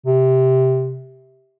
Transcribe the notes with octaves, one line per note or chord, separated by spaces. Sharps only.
C3